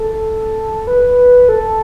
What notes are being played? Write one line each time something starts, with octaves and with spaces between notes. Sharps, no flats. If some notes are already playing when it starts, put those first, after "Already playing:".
Already playing: A4
B4
A4